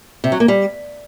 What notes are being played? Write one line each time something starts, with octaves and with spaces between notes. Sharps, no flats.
C3
F#3
A#3
G3